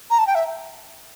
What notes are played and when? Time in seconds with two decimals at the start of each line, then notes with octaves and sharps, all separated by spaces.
0.10 A#5
0.19 A5
0.27 G5
0.35 E5